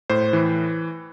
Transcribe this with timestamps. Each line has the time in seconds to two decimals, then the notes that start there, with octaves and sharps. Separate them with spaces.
0.10 A2 C5
0.33 E3